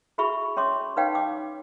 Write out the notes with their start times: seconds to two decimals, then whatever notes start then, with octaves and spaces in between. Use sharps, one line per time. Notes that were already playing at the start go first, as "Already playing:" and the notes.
0.18 E4 F#4 G#4 E5 B5 C#6
0.57 C#4 C#5 E5 C6 D6
0.97 D#4 B4 C#5 F5 G5
1.15 D6